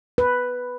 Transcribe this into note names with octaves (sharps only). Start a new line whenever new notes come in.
B4